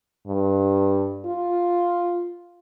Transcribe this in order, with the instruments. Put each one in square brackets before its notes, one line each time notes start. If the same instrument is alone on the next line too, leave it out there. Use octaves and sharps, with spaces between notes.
[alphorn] G2
F4